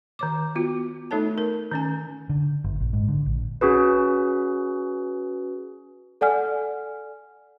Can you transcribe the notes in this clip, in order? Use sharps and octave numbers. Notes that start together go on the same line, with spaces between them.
D#3 C#5 D6
B3 F4 F#4
A3 D#4 A4 C#5 A5
A#4
D#3 C#4 G#5
D3
G1
A#1
G#2
D3
A#1
C#4 F#4 G#4 B4
A4 D5 F#5 G#5 F6